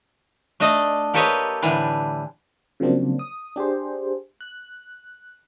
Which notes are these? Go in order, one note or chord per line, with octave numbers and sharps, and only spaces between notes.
A3 D4 A4 D#5
A#3 G4 A4 B4 C#5 D#5
A2 D3 E3 G3 D4
C#3 F3 F#3 A#3 C4 D4
D#6
D4 G4 G#4 C5
F#6